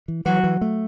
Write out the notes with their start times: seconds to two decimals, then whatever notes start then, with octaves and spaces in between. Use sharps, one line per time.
0.08 E3
0.26 E3 F#3 F#4
0.44 E3
0.61 A3